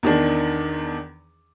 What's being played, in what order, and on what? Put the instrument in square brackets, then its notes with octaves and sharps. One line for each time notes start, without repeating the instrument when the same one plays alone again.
[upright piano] E2 D#3 D4